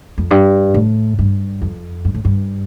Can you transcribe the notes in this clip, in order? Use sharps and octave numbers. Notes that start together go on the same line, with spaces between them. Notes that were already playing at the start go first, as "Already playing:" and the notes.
F2
G2
A2
G2
F2
G2
A2
G2